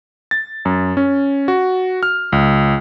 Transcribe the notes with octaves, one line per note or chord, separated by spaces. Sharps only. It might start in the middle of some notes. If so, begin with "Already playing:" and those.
A6
F#2
C#4
F#4
F6
C#2